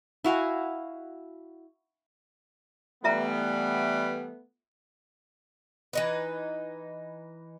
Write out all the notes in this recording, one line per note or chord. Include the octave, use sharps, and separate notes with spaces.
E4 F#4 F5 G#5
E3 G3 A3 B3 F4 E5 A#5
E3 D#4 B4